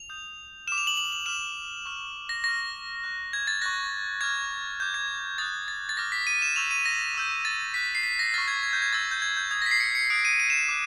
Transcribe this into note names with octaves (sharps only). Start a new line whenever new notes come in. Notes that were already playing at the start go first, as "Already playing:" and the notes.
Already playing: F7
D#6 G6
D6 F6 E7
F7
F#7
F#7
F#7
D6 F6 E7
C#6 F6
A#6
C#6 F6 A#6
C#6 F#6
G#6
A6
C#6 F#6 A#6
D6 F6 G#6
D6 G6
G#6
D#6 F#6 A6
A6
A6
D6 F6 A#6
B6
D#7
E7
C#6 E6 G6 F7
D#7
A#6
C#6 E6 G6
A6
C#6 F#6 B6
C7
B6
A#6
C#6 F6 A6
G#6
G#6
G6
G#6
C#6 E6 G6 A6
G6
G#6
G6
D#6 G6 G#6
A#6 B6
C7
C#7
C#7
D#6 F#6 D7
D#7
D#7
E7
D6 F#6